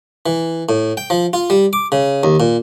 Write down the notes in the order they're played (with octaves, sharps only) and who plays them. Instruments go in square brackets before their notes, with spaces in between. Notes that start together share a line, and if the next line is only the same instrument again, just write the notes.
[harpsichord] E3
A2
G5
F3
F4
G3
D6
C#3
D#2
A#2